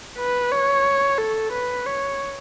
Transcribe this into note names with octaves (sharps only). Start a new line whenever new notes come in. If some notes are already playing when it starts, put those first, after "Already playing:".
B4
C#5
A4
B4
C#5